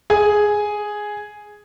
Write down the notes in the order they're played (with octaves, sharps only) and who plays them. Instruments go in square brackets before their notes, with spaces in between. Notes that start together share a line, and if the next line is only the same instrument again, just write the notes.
[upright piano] G#4 G#5